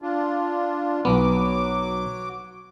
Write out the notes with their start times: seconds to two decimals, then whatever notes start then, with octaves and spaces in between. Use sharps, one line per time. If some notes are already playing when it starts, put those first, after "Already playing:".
0.02 D4 F4
1.05 B1 F#3 B3 D6